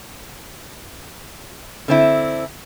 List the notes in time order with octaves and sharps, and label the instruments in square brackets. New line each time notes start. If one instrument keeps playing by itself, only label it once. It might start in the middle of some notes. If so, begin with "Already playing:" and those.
[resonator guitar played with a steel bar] D3 C4 E4